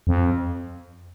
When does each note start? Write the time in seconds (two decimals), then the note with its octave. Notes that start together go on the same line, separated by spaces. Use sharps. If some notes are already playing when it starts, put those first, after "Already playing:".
0.07 F2